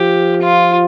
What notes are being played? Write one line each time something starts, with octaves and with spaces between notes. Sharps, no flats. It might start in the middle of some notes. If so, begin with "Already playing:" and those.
Already playing: F3 G4
F4